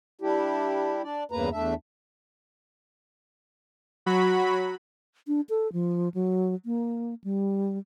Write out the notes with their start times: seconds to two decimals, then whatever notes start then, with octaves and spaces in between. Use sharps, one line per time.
0.21 G3 D4 E4 G4
1.03 D4 D5
1.31 E2 G2 C#3 A#3 B4 A#5
1.52 E2 A3 D4 E5
4.06 F#3 F#4 B5
5.27 D4
5.49 A4
5.73 F3
6.14 F#3
6.65 A#3
7.24 G3